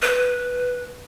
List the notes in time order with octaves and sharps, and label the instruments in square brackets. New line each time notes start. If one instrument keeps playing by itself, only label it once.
[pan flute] B4